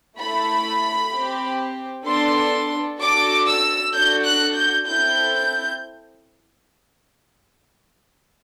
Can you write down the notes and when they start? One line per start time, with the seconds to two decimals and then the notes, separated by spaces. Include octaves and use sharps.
0.18 A3 E4 A4 B5
1.12 C4 G4
2.06 B3 D4 A4 C6
2.99 D4 F#4 A4 D6
3.47 E6
3.93 D4 F#4 A4 G6
4.25 F#6
4.55 G6
4.87 C4 E4 A4 G6
5.33 G6